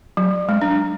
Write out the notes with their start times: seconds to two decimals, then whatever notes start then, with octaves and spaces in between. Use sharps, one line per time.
0.17 F#3
0.49 G#3
0.62 D4